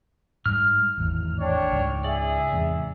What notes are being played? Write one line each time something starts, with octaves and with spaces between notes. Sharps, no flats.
G#2 G3 G#3 F6
G#1 E2 A2
D4 C#5 G5
C#2 G#2
G#4 D5 E5
E2 G#2 C3